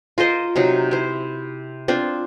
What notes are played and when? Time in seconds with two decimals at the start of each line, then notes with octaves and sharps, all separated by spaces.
0.18 F4 A#4 C5 D#5
0.56 C3 F#3 D#4
0.91 E4 C5
1.88 C4 D4 F4